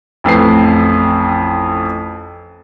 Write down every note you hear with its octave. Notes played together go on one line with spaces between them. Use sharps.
A1 F2 B4 C7